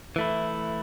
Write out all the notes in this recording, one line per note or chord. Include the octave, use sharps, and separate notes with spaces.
E3 A3 E4